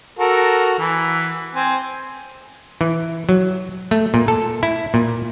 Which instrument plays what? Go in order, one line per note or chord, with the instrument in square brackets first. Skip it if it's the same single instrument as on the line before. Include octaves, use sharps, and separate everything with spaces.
[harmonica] F#4 A4 A#4
E3
C4 G#5
[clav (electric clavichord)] E3
F#3
A3
A#2
A4
E4
A#2